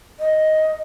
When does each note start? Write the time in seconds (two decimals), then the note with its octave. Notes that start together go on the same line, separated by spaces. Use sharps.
0.20 D#5